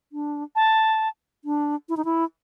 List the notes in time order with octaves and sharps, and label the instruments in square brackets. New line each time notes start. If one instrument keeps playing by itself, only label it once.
[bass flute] D4
[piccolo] A5
[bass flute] D4
E4
D#4
E4